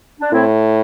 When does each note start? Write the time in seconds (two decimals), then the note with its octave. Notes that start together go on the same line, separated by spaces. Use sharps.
0.21 D4
0.32 A2 C4 E4